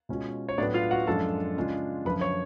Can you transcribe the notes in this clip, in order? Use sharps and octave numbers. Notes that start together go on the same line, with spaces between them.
B2 G#3 C#4 F4
C#5
A2 F#3 B3 D4 D5
F4 F5
F#4 F#5
F#2 F3 G#3 D4 F4 A4 A5
C#3 G#3 D4 F4
F#2 D3 F3 B4 B5
C#5 C#6